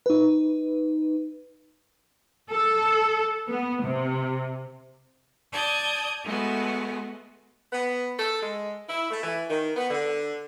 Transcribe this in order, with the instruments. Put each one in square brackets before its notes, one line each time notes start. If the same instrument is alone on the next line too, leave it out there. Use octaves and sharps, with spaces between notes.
[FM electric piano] D#4 B4
[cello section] A4
B3
C3
[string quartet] D5 A5 D#6 G6 G#6
G#3 A3 B3 F#4 B4
[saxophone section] B3
A4
G#3
E4
A3
E3
D#3
B3
D3